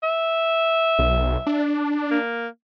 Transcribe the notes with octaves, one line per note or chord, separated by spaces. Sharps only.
E5
B1
D4
A#3